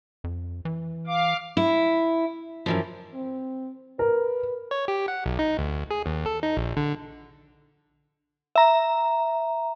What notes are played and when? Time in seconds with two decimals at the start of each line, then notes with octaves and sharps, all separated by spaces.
0.24 F2
0.65 E3
1.07 F5 D6
1.57 E4
2.66 F#2 E3 F3
3.14 C4
3.99 A#4 B4
4.71 C#5
4.88 G4
5.08 F#5
5.26 B1
5.39 D#4
5.58 D2
5.91 G#4
6.06 D#2
6.26 A4
6.43 D#4
6.57 A#1
6.77 D3
8.56 E5 A#5